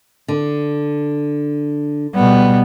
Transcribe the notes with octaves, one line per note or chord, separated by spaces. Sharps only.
D3
B2 G3 B3